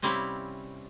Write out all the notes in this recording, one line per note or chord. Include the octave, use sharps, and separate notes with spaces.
C3 G3 C4 C#4 E4 F5